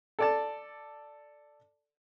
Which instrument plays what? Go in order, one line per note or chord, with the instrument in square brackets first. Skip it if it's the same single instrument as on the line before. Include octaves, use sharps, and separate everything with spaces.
[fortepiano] A4 D5 A5